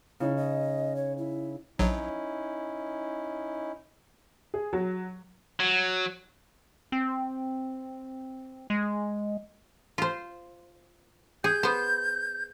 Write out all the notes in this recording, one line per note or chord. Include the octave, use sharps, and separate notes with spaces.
C#3 D#4 E4
D#5
C#5
E4
A#1 F#3 C#4 D#4 E4
G#4
F#3
F#3
C4
G#3
F4 C5
G#4 G6
B3 C5